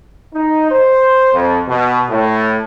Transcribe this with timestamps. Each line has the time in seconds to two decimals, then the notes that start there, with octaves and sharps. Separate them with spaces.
0.35 D#4
0.71 C5
1.34 F2
1.68 B2
2.10 A2